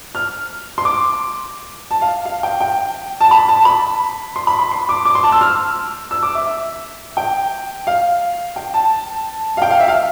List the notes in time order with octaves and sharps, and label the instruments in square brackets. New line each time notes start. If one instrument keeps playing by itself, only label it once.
[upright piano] F6
C6
D6
A5
F5
F5
G5
G5
A5
B5
A5
A5
B5
C6
B5
B5
C6
D6
D6
C6
A5
E6
F6
E6
D6
E5
E5
G5
F5
G5
A5
F5
G5
F5
E5
F5